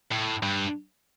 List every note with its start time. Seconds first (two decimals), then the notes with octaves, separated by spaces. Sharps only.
0.11 A2
0.43 G2